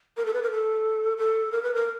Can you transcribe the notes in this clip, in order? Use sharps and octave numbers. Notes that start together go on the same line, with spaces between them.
A#4
A4
B4
A#4
A4
A4
A#4
B4
A#4